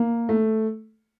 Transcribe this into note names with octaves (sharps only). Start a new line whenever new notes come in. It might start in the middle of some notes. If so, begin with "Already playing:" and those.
Already playing: A#3
A3